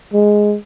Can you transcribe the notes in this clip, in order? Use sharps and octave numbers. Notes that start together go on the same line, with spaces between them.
G#3